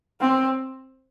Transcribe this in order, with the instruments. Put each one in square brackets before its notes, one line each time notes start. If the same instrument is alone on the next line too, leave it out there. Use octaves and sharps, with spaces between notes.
[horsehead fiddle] C4